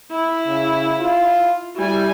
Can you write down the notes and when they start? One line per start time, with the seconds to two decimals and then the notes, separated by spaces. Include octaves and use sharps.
0.11 E4
0.46 C#3
1.00 F4
1.76 G3 E4 G#5